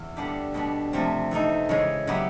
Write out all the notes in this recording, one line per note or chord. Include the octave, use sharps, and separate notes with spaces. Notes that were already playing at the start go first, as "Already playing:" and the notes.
Already playing: E2
D3 G3 B3 D4 G4
B2 G3 B3 D4
C3 F3 A3 C4
E3 A3 C4 D#4
C#3 E3 G#3
C#3 F#3 B3 E4 G4